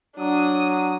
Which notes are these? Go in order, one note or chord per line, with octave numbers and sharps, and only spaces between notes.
F#3 D4 D#6